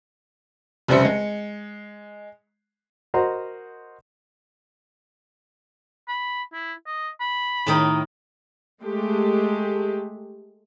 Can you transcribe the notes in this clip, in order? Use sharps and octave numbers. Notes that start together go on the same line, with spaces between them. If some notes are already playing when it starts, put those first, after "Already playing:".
F1 C#3 G3 C5 E5 C#7
G#3
F#4 A#4 C5 D#5 A#5 C6
B5
E4
D#5
B5
A2 D#3 D#4
G#3 A3 G4